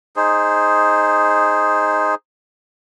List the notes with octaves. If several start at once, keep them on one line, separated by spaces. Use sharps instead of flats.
D#4 G#4 C5